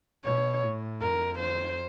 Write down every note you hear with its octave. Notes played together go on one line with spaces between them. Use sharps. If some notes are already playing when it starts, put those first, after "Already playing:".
B2 C#5
A2
F2 A#4
C5